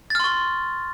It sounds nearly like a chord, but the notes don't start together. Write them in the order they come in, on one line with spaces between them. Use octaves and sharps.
A6 F6 C6 C#6